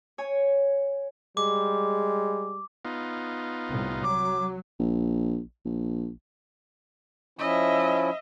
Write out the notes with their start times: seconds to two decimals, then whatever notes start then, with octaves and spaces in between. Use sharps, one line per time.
0.18 C#5 G#5
1.37 G3 G#3 D6
2.85 B3 D#4 F4
3.69 C2 A2
4.04 F#3 D6
4.79 A#1
5.65 A#1
7.39 F3 C#4 E4 D#5 E5